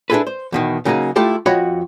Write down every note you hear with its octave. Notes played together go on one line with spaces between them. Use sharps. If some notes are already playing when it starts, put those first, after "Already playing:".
D4 E4 F4 G#4 A4 B4
C5
E2 B2 D#3
C#3 F#3 A#3 D#4 G#4
A3 E4 F4 G4 A4
F2 F#4 C#5 D#5 F#5 B5